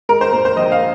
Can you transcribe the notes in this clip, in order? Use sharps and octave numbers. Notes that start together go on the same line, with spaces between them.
G#3 A#4
C5
A#2 A#4
C5
A#1 D#5
F5